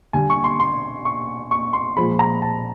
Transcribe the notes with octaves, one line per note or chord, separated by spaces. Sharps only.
D3 G3 G#5
C#6
C6
C6
C#6
C#6
C6
A#2 F3 G#3 B5
A#5
A5